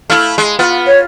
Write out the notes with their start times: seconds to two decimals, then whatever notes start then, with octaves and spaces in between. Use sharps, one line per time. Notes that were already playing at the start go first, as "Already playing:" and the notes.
0.10 A3 E4 F5
0.38 G#3
0.59 B3 F4
0.87 C#5